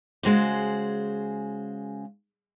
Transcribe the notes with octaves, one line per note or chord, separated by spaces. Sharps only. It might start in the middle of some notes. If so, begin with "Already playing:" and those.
C#3 G#3 F#4 C5